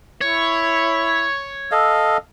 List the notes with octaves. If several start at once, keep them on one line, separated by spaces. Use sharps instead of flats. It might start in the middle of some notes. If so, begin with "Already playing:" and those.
E4 C#5
A4 D#5 F5 E6